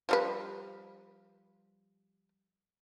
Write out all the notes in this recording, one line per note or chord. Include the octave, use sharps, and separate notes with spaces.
F3 G3 B4